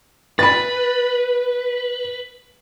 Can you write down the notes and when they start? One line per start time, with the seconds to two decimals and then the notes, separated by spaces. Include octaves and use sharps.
0.39 B4 B5 A6